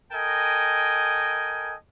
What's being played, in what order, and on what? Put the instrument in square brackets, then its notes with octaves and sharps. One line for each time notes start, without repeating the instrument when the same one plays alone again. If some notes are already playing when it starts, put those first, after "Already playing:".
[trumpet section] A4 A#4 D#5 G5 G#5